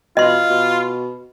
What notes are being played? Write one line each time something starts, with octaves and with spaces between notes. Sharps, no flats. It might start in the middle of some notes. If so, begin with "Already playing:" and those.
B2 F4 D#5 C6
B2